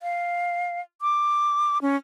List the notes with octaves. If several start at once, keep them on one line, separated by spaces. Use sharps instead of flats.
F5
D6
C#4